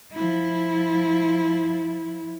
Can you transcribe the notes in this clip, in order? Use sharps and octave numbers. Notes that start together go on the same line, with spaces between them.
F3 E4